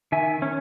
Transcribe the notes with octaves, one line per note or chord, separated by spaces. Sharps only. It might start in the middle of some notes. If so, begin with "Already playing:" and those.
D#3 E5 G#5
C#4